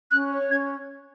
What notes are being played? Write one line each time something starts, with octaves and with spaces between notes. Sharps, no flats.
C#4 F#6
C#5
C#4 G#6